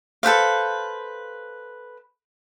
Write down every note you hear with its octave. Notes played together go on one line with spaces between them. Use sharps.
A4 B4 C5 F5